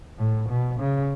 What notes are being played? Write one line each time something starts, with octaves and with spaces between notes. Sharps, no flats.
A2
B2
C#3